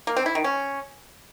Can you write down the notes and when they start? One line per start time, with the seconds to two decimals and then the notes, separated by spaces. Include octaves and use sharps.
0.07 A#3
0.16 C4
0.26 E4
0.35 D#3
0.44 C#4